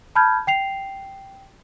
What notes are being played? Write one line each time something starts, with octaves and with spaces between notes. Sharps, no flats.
A5 B5 F6 G6 G#6
G5 C7 F7